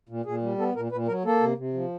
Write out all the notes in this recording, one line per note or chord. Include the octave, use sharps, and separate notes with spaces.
A#2
A#2 G#4
G3
B3 A4
A#2 A#4
A#2 B4
F#3 A#4
A#3 A4
C3
C3
F3